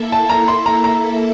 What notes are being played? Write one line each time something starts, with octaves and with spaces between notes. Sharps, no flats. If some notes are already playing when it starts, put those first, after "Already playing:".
Already playing: A#3 E4 A4 E5
A5
A#5
C6
A#5
A#5